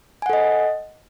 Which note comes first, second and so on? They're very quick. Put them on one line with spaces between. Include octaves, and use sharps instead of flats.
G#5 F#5 A4 D#5